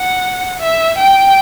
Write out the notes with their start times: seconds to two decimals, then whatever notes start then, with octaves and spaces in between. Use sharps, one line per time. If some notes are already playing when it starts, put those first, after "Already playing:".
Already playing: F#5
0.60 E5
0.98 G5